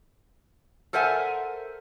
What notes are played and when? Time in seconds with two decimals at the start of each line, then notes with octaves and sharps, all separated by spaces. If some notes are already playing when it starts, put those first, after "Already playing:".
0.93 A4 A#4 C5 E5 F#5 G#5